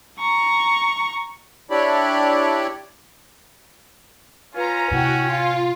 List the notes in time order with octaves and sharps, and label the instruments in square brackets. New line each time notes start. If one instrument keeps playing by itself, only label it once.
[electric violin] A#5 C#6
[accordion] D4 E4 G4 C#5 D5 B5
[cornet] C#4 [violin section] F4 A#5 [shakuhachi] B4
[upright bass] A2 C3 [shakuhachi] E4 [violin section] F#4 G5
[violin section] F4 [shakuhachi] F5